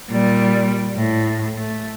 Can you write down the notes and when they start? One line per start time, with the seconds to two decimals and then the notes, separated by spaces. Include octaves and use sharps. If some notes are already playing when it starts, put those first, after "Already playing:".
0.11 A#2 G3
0.96 A2
1.56 A3